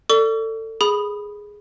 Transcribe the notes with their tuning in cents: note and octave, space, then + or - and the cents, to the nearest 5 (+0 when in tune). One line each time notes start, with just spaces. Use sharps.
A4 +25 D5 +0 C#6 +40
G#4 +0 B5 +0 D#6 -20